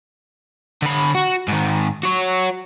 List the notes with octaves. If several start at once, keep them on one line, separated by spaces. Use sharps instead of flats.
D3 B5
F#4
G#2 D#3
F#4 C#5